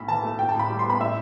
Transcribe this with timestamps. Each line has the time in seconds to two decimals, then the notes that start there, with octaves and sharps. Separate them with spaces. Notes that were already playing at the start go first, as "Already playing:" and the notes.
Already playing: B1 A2 B5
0.08 E3 A5
0.23 A3
0.39 A1 G5
0.49 A5
0.55 A2 B5
0.70 G3
0.79 C6
0.85 B3 B5
1.00 A2 E5